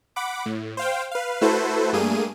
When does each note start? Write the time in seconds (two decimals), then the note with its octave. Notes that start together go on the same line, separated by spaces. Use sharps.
0.16 F#5 B5 D6
0.46 A2
0.77 C5 F5 G5
1.12 B4 F5
1.41 A3 E4 F#4 A4 B4 C5
1.93 G2 G3 A3 A#3 G#4 D#7